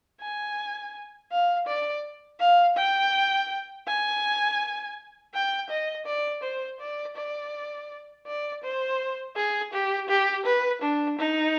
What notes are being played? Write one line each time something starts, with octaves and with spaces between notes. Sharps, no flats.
G#5
F5
D5
F5
G5
G#5
G5
D#5
D5
C5
D5
D5
D5
C5
G#4
G4
G4
B4
D4
D#4